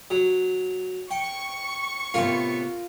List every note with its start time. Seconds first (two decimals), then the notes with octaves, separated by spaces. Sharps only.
0.10 F#3
1.11 G5 C#6
2.14 A2 C3 B3 F4 A#4